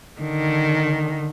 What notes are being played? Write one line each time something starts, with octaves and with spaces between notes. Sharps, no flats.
D3 D#3